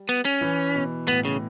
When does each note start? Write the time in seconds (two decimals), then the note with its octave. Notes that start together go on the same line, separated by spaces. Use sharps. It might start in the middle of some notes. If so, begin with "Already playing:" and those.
Already playing: G3
0.09 B3
0.25 C#4
0.41 E3
0.75 B2
1.08 A2 B3
1.25 C#3